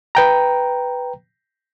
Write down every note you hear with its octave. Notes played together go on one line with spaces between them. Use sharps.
B4 G5 A#5